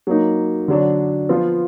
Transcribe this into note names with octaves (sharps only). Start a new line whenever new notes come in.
F#3 A#3 D#4
D3 F#3 D4
F3 B3 F4